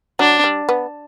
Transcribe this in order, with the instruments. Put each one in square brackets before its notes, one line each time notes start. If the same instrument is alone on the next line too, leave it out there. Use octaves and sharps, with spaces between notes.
[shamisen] F#3 [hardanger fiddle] D4
[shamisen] G3
B3